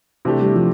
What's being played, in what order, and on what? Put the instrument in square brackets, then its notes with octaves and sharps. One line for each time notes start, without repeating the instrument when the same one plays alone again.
[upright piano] C3 E3 A3 D4 G4
[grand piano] G3
F3